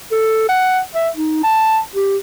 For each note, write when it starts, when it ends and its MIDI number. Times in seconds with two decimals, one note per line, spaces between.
0.11 0.49 69
0.49 0.80 78
0.95 1.09 76
1.16 1.43 63
1.43 1.79 81
1.96 2.17 67